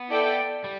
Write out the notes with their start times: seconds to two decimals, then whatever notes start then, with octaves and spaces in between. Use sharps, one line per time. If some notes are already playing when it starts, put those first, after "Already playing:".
Already playing: B3
0.09 E4 A4 D5 G5
0.64 G3